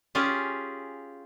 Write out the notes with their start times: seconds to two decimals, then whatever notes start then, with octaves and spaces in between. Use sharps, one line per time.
0.15 C#4 F4 G4 G#4